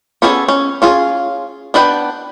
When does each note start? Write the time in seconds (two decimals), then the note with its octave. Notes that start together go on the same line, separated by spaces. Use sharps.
0.22 B3 C#4 G#4 A4
0.48 C#4
0.82 C#4 F4 G#4
1.74 B3 D4 B4 G5